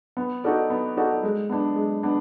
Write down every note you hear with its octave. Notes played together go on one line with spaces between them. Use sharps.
B3
D#4 F#4 A4 D5
B3
D#4 F#4 A4 D5
G#3
B3 D4
G#3
B3 D4